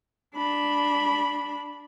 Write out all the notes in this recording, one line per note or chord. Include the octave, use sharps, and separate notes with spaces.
D4 B5